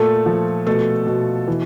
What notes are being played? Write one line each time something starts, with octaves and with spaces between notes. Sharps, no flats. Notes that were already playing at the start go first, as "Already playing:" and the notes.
Already playing: A#2 A3 A4
F3
B2 A3 A4
B2
E3